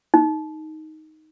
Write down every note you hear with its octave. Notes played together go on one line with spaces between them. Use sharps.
D#4